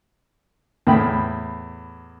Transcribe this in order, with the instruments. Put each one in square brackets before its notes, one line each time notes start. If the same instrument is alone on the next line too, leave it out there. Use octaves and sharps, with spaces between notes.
[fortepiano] E2 A2 G5 B5